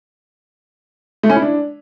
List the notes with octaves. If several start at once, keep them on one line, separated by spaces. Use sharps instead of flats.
A3
C#4
E4
D4